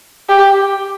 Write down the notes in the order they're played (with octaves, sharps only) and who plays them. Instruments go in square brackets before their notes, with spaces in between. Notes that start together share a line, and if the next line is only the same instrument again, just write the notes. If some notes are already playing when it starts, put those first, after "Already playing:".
[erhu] G4